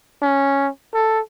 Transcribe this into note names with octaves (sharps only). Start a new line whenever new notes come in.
C#4
A4